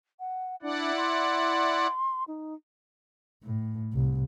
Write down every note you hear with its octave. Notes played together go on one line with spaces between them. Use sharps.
F#5
D4 E4 D5 F#5
C6
D#4
A2
C2